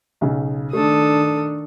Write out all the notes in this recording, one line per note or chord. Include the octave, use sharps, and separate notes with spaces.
B1 C#3
D#3 A3 D4 A4 D#6